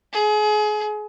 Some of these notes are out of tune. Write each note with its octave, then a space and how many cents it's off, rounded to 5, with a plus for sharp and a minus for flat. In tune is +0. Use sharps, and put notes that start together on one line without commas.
G#4 +30